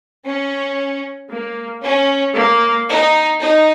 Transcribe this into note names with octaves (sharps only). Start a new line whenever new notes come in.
C#4
A#3
C#4
A#3
D#4
D#4